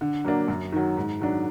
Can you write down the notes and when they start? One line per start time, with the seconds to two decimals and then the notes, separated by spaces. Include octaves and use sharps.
0.01 D3
0.25 F#3 A#3 D4
0.48 F#2
0.72 D#3 F#3
0.97 G#2
1.21 D#3 F#3 D4